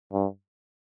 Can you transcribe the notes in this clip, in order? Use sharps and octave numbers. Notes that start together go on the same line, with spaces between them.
G2